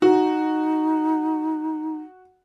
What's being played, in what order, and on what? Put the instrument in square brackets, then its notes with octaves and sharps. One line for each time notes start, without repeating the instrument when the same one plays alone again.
[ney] D#4 [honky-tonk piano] F#4